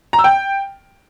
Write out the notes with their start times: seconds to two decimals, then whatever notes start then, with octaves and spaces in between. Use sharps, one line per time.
0.13 A#5
0.19 E6
0.24 G5